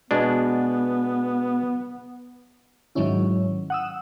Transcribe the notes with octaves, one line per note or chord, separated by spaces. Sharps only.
B2 G#3 B3 D4
G#2 D#3 F#3 G#3 C#4 E4
F#5 D#6 E6